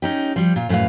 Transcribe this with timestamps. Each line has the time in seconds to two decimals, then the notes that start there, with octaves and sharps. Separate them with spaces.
0.02 C#4 D#4 G4
0.36 F3 G3
0.56 A#2 F4
0.69 F#2 A2 G#4 B4 F5